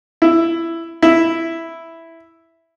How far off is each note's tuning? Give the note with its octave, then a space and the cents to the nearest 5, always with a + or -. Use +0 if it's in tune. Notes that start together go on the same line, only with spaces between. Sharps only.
E4 +10
E4 +0